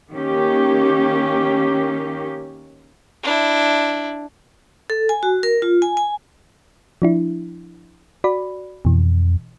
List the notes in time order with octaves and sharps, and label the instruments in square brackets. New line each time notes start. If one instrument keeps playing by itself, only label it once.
[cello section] D#3 A#3 C#4 G4
[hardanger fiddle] D4 E4
[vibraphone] A4
G#5
F#4
A#4
F4
G#5
G#5
[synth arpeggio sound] F3 D4 E4
F#4 D5 B5
[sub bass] F2 [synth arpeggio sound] B2 E3